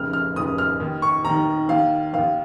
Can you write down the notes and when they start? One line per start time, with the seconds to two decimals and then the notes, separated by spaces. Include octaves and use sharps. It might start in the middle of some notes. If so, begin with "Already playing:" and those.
Already playing: F1 D#2 C#3 F6
0.13 F6
0.36 F1 D#2 C#3 D#6
0.58 F6
0.80 D#2 D#3
1.02 C#6
1.24 D#2 D#3 A#5
1.69 D#2 D#3 F5
2.13 D#2 D#3 F5